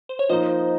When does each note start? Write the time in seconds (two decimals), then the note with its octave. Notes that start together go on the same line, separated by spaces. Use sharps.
0.09 C5
0.19 C#5
0.29 F3 A#3 D#4 C5 D#5